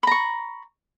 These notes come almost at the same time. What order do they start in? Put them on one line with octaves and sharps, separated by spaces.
B5 A#5 C#6